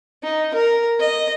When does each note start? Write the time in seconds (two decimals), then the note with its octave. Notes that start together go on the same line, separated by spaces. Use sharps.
0.23 D#4
0.54 A#4
0.99 D#5